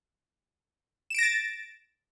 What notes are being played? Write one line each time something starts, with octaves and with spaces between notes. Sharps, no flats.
A6 A#6 D7 E7